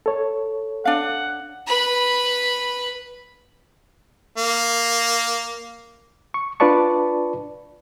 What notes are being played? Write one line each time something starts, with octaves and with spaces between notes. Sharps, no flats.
A4 C#5
D4 F5 F#5
B4 B5
A#3
C#6
D4 F4 B4 D5 A5 C#6